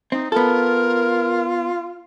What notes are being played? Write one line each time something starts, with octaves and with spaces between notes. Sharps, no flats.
C4 D#4
B3 F4 A4 A#4